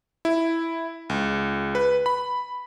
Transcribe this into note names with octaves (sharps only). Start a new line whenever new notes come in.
E4
C#2
B4
B5